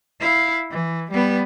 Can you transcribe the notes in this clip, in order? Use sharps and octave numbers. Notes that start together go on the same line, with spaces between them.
E4 F5
E3
G3 B3